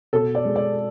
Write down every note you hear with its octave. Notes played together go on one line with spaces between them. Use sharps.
B2 A4
D5
G#3
D5